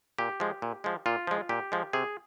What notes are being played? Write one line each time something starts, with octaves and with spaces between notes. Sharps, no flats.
A#2 G4
F3 G#3
A#2
F3 G#3
A#2 F4
F3 G#3
A#2 G4
F3 G#3
C3 G#4